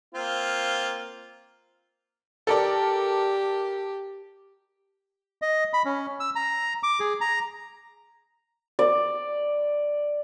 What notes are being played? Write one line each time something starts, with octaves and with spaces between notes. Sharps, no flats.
A#3 C4 F4
G4 A4 A#4 D5
D#5
B5
C#4
E6
A#5
D6
G#4
A#5
D5